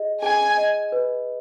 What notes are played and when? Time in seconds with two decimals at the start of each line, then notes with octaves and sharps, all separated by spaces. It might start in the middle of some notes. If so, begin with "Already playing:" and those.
Already playing: G#4 D#5
0.22 G#4 G#5
0.58 D#5
0.92 B4